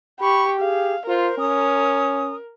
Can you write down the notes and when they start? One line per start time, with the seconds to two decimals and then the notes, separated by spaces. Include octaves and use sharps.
0.20 G4 B5 C#6
0.60 G4 G#4 F5
1.08 F4 A#4 C5
1.39 C#4 D#6